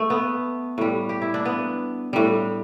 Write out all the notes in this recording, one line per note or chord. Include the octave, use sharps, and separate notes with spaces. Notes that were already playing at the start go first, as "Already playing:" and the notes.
Already playing: A3
B3
A2 G3
G4
E4
D4
B3
A2 G3